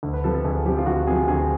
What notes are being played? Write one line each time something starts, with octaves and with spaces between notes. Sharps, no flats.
D2
B4
C3 F3 A4
A4
D2 G#4
C3 F3 G4
F4
D2 F#4
C3 F3 G#4
D2 G#4